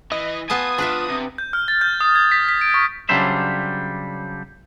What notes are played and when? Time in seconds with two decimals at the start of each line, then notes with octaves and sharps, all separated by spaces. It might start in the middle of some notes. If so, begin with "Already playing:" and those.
0.12 E3 D#5
0.50 B3 F4 G#5 A5 D#6
0.78 F3 D4 B4 E5
1.10 C3
1.38 G6
1.53 F6
1.68 A6
1.81 G6
2.01 D#6
2.16 G#6
2.32 B6
2.49 B6
2.61 D7
2.74 C#6
3.09 C#3 F#3 G3 D4 C5 E5